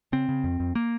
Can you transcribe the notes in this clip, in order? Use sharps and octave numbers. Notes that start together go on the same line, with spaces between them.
C#3 C4
C#3
F2
F2
A#3